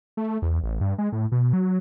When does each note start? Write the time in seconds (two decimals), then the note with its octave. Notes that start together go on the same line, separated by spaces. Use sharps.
0.17 A3
0.42 E2
0.64 A1
0.81 G2
0.98 G#3
1.12 A2
1.32 B2
1.53 F#3